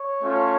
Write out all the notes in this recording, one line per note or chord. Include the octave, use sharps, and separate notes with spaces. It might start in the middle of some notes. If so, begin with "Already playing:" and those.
Already playing: C#5
A3 C#4 F4